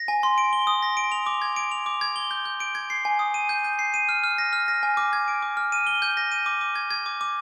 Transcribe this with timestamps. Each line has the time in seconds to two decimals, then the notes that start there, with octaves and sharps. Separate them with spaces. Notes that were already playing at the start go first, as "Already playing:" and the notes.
Already playing: A#6
0.08 G#5
0.23 C6
0.38 D7
0.53 G7
0.67 D#6
0.83 A#6
0.97 D7
1.12 F7
1.26 D6
1.42 G#6
1.56 D7
1.72 F7
1.86 D6
2.01 G#6
2.16 G7
2.31 G6
2.45 G6
2.60 D7
2.75 G#6
2.90 C7
3.05 G#5
3.19 D#6
3.34 D#7
3.49 G6
3.64 G6
3.79 C7
3.94 D#7
4.09 F6
4.24 F6
4.38 A#6
4.53 F6
4.68 A#6
4.83 G#5
4.97 D6
5.13 G#6
5.28 D7
5.42 D6
5.57 F6
5.72 D#7
5.87 G7
6.02 G6
6.17 A#6
6.32 D#7
6.46 D6
6.61 D6
6.75 G#6
6.91 G#6
7.06 D6
7.21 D6